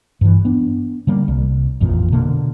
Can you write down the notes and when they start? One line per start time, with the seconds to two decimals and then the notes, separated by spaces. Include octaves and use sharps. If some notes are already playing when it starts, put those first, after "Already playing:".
0.21 G2 E3
0.45 B3 D4
1.07 D3 G3 A#3
1.28 C2
1.81 A1 F2 A#2 F3
2.12 B2 D3 A#3